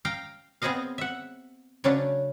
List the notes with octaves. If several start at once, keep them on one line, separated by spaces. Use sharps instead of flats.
F5 G5 A#5
B3 C4 G#4 C5 D#5 F5
E5 F#5
C#3 F#3 A3 C#4 D4